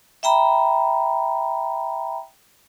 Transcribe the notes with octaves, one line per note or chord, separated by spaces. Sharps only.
E5 G5 A#5 B5